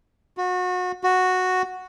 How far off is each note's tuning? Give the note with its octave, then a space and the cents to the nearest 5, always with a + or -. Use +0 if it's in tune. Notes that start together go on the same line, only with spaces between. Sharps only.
F#4 -30
F#4 -5